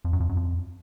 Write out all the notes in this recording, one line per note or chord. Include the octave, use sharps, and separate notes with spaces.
F2
F#2
F2
F#2
F2